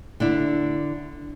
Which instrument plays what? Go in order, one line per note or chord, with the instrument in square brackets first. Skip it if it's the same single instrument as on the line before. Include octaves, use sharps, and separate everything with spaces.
[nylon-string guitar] D3 D4 E4